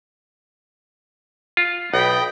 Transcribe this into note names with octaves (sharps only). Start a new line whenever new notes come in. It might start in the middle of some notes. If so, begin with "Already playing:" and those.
F4
B1 D#5 G5 B5